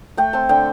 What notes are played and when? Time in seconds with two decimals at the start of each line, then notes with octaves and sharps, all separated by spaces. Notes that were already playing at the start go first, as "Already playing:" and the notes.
0.17 A3 G5
0.33 C4 A5
0.49 D3 G5